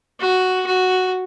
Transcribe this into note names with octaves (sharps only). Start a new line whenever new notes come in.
F#4
F#4